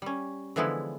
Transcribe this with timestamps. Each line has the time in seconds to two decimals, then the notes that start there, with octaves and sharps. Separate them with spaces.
0.02 G3 C#4
0.56 D3 E3 F3 G#3 B3 E4